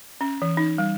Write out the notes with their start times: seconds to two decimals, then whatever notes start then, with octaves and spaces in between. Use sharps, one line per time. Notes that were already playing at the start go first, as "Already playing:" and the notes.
0.21 C#4
0.42 E3
0.57 D#4
0.78 G3